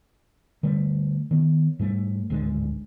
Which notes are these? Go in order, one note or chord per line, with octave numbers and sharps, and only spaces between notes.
D3 G3 A3
D#3 B3
G#2 G3 A3
D1 G#1 D3 G#3